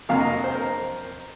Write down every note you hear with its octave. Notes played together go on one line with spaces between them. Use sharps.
F2 C3 F#3 A#3 F5
D#5
C5
A#4